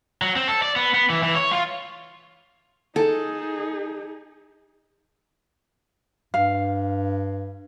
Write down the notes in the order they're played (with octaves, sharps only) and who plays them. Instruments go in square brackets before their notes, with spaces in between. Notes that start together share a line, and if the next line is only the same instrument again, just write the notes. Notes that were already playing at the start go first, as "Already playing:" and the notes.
[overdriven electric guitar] F#3
C4
A4
D5
B3
B3
E3
E3
C#5
F4
[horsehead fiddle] D#4 G#4 [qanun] A4
[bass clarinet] G2 [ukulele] F5